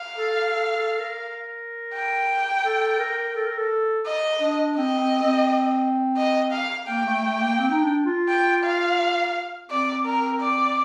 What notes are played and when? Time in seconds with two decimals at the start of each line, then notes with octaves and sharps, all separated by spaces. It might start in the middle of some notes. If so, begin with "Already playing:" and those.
Already playing: F5
0.17 A4
0.53 A4
0.76 A4
1.00 A#4
1.94 G5
2.65 A4
2.99 A#4
3.35 A4
3.47 A#4
3.58 A4
4.06 D#5
4.40 D4
4.76 C4 D#5
4.99 C4
5.23 C4
6.17 D#5
6.52 F5
6.88 A#3 G5
7.06 A3
7.24 A3
7.41 A#3
7.59 C4
7.70 D#4
7.81 D4
8.06 F4
8.29 G5
8.64 F5
9.70 C4 D5
10.06 A#4
10.41 D5